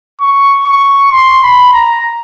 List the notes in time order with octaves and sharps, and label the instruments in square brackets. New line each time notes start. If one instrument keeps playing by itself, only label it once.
[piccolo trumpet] C#6
C#6
C6
B5
A#5